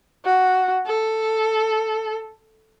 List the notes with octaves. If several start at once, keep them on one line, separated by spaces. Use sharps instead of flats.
F#4
A4